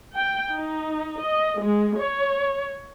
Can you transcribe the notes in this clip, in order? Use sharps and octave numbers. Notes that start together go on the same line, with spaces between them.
G5
D#4
D#5
G#3
C#5